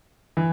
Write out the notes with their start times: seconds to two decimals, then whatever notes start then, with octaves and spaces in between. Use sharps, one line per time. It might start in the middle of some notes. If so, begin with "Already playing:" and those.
0.37 E3